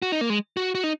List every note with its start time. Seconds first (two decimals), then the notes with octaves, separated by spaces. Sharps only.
0.02 F#4
0.12 D#4
0.21 A#3
0.30 G#3
0.57 F#4
0.75 F#4
0.84 D#4